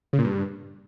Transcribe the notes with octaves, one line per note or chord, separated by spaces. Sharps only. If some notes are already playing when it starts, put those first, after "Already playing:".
C#3
A#2
G2